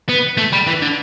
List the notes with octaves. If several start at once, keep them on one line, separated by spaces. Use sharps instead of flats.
B3
A3
G3
E3
D3